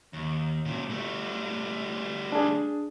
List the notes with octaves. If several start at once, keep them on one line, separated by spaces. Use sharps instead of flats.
D#2
A#2 C#3
G3 A3
D4 G#4